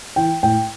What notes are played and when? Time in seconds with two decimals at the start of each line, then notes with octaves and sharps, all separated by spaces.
0.16 E3 G5
0.43 A2 G5